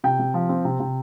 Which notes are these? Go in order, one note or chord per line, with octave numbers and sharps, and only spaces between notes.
C3 G5
C3
F3
C4
C3
C3